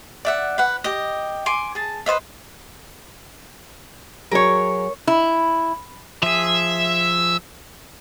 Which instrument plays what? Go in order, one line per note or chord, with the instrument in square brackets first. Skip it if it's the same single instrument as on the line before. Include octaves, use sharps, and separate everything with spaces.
[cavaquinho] D5 E5 F#5
B4 F#5
G4 D#5
G#5 C6 D6
G#4 A5
B4 C5 D#5 E5
[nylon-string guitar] F#3 G#4 [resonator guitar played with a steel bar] A#4 C#5
[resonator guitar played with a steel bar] E4
[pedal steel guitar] F3 G#4 [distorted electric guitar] E5